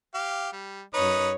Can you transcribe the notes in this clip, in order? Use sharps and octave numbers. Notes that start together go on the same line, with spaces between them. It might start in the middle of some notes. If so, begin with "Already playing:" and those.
G4 F5
G3
F#2 D#4 B4 C#5 D#6